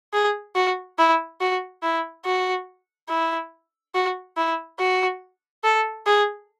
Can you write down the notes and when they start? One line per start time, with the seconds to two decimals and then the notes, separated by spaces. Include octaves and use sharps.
0.14 G#4
0.55 F#4
0.98 E4
1.41 F#4
1.83 E4
2.25 F#4
3.09 E4
3.94 F#4
4.37 E4
4.79 F#4
5.64 A4
6.06 G#4